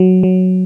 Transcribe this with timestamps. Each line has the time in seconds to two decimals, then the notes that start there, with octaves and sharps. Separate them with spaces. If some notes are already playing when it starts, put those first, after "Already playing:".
Already playing: F#3
0.23 F#3